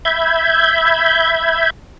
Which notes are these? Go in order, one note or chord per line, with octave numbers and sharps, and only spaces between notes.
E5 B5 G6 G#6